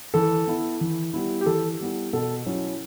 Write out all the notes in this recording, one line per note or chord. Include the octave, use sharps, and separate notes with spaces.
E3 A4
B3 E4
E3
G3 B3 E4
G4
E3 A4
G3 B3 E4
B2 A4
F#3 C#4 E4